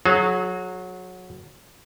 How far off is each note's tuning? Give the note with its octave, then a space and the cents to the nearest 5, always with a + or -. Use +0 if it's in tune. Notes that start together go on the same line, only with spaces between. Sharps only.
F#3 -15 G#4 +35